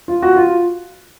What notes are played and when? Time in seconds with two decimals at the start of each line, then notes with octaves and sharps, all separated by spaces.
0.08 F4
0.22 F#4
0.36 F4